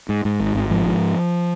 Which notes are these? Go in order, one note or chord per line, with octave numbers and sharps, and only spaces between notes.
G#2
G#2
G#1
G#1
G#2 F3
G#2